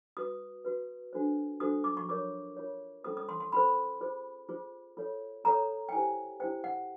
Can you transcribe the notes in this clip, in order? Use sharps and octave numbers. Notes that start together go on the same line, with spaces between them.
F#4 B4 D#6
F#4 B4
D4 F#4 A4 C5
D4 F#4 A4 C5 D#6
D6
C#6
F4 A#4 C#5 D6
F4 A#4 C#5
C#4 F4 A4 C5 D#6
D#6
C6
C6
C#4 F4 A4 C5 B5
F4 G#4 C5
F4 G#4 C5
F4 A4 C#5
F4 A4 C#5 A#5
G5
E4 G4 C5 G#5
E4 G4 C5 G5
F#5